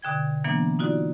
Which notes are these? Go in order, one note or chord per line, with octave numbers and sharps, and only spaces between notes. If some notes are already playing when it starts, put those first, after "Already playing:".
B2 D3 G5 G#6
E3 F#3 A#3 B3 D4
D#4 F4 F#4 D5